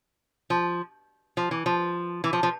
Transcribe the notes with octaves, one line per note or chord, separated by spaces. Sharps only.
F3
F3
E3
F3
E3
F3
F3